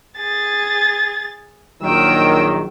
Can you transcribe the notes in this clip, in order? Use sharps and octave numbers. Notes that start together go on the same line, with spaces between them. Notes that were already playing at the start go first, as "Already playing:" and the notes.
G#4 A6
A#1 D#3 F#3 A#4 G5 E6